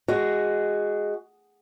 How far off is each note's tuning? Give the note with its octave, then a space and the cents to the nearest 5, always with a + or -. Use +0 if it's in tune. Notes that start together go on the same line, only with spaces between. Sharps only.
G#3 +0 F#4 +10